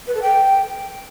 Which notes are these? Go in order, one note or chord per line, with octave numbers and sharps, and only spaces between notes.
B4
A4
G5